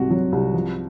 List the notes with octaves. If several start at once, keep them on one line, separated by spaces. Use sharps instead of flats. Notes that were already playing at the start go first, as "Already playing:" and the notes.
Already playing: C2 G#2 C3 F#4
F#3
C2
F3